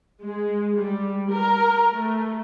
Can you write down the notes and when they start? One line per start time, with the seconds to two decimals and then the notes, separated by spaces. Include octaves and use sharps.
0.23 G#3
0.76 G3
1.30 A#4
1.92 A3